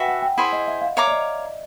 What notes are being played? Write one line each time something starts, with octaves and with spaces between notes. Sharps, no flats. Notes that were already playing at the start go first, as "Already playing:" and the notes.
Already playing: F#4 B4 E5 G5 G#5
F#5
G5
E4 G#4 C5 F#5
D#5
E5
F5
C#5 E5 F5 A#5 D6
D5
D#5